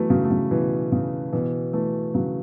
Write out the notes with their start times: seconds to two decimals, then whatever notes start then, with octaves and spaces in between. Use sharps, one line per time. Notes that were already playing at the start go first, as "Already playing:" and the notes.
Already playing: E3 F#3 A3 B3
0.10 C#3 F#3
0.25 A3
0.31 C#3 F#3
0.51 B2 E3
0.92 C#3
1.33 B2 E3
1.73 E3 A3
2.14 C#3 F#3